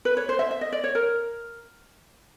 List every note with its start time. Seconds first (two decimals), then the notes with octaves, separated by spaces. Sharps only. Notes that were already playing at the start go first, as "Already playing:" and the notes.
0.05 B4
0.17 C#5
0.29 C5
0.39 E5
0.51 E5
0.61 D#5
0.72 D5
0.84 C#5
0.95 A#4